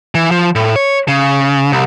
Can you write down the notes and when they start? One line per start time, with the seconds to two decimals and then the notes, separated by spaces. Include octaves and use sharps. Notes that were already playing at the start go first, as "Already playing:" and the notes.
0.15 E3
0.31 F3
0.55 A2
0.76 C#5
1.08 C#3
1.72 C2